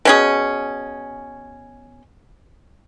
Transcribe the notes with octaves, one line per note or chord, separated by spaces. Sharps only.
B2 C#4 G#4